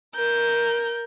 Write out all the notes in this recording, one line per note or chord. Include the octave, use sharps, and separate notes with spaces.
A#4 G6